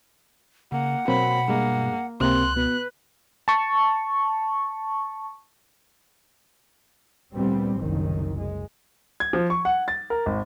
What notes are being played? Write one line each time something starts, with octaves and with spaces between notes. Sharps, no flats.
C#3 A#3 F#5
B2 F#3 A#3 C4 B5
G2 G#3 A#3
C#2 C3 A#3 C4 C6 F#6
B2 B4
A5 C#6
D2 A#2 G3 B3 C4
F#1 C2 F#2 D#3
G#3
G#6
F3
C#6
F#5
A6
A#4
G#1